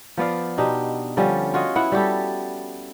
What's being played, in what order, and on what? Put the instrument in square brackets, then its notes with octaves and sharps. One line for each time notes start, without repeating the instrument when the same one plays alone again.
[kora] F3 B3 D5 F5
B2 D4 D#4 G4
D3 F3 G3 C#4
F4 F#4 C#5 D#5
B3 E4 F#5
G3 F#4 G4 A4